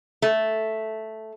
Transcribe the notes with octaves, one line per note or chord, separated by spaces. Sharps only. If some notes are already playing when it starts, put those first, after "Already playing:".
A3